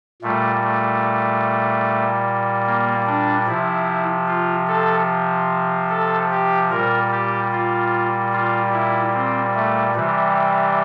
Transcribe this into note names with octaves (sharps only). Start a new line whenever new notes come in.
A#2 G3 A3
A3
A#3
D4
C3 F3 E4
F4
A4
A4
G4
A#2 G3 A#4
G4
F4
F4
E4
C4
A3
C3 E3 G3